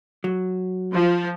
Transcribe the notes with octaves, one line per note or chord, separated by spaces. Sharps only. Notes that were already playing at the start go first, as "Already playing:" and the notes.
F#3
F3